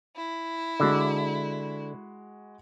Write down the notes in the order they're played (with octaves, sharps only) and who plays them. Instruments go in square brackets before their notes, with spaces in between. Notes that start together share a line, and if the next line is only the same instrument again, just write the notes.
[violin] E4
[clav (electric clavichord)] D3 [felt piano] G#3 F#4 B5